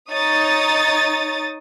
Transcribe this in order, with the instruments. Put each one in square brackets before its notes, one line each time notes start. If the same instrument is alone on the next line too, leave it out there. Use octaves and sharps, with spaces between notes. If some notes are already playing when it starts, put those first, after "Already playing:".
[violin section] D#4 C#5 D#6 A6